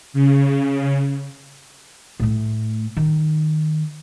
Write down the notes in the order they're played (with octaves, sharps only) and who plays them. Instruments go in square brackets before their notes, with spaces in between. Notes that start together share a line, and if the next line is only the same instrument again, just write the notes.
[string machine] C#3
[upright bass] A2 A3
D#3